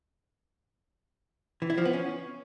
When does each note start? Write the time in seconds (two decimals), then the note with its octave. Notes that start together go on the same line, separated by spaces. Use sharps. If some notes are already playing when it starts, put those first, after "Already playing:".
1.62 E3
1.70 E4
1.78 F3
1.85 B3
1.93 C#4